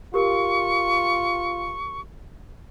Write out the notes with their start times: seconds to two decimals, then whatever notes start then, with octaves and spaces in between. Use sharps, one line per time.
0.14 F4 G4 A#4 C#6